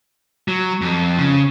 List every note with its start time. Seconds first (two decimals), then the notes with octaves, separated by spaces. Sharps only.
0.48 F#3
0.81 F2
1.18 C#3